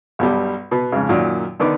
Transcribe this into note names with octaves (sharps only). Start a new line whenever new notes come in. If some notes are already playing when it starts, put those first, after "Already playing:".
B1 G2 B2 G3
B2 B3
F2 G#2 C#3
F#2 A#2 D#3 F#3
D3 D#3 B3 D#4 D6